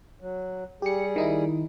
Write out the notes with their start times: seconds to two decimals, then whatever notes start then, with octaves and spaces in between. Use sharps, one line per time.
0.21 F#3
0.82 G3 G4 G#4 C#7
1.16 D#3 D#4 E4